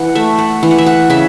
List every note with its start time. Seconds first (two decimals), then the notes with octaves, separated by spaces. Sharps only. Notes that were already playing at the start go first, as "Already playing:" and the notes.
Already playing: E3 F#5
0.15 A3 E5
0.39 F#5
0.63 E3
0.71 F#5
0.78 E5
0.86 F#5
1.10 C#3 E5